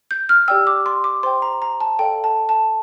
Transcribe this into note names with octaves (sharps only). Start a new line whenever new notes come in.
G6
F6
G4 D5 G5 E6
D6
C6
D6
C5 G5 C6
A#5
A#5
A5
A4 D5 F5 G5
A5
A5